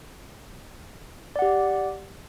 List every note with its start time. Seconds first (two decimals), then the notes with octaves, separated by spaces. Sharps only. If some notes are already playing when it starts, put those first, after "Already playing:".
1.36 D5
1.39 F#5
1.42 G4